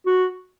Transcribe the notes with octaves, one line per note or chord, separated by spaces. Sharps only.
F#4